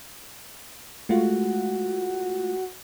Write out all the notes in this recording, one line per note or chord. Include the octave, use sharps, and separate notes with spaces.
G#3 A3 F4 F#4